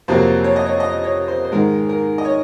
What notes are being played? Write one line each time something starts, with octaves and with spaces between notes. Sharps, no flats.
F2 C3 F#3 A#3 C5
C#5
D#5
C#5
D#5
C#5
C5
C5
G#2 D#3 G#3 A#4
A#4
D#5
C#5